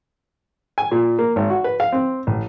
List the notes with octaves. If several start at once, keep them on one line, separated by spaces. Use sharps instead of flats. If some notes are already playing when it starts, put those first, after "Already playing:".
G#5
A#2
A#3
G#1
F#4
B4
F5
C4
A1